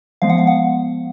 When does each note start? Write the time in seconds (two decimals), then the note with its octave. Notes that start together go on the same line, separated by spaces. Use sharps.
0.22 F3 G#3 B3 F5
0.29 F#5
0.38 F5
0.47 F#5